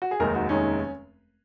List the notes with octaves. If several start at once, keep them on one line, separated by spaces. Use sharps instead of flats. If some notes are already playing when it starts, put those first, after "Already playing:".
F#4
G#4
F1 D#2 D#3 G#3 A#4
F#4
F1 D#2 D#3 G#3 C#4